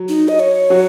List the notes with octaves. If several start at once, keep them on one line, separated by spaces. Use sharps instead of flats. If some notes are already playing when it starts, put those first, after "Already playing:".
Already playing: F#3
D#4
D#5
C#5
F#3 F#4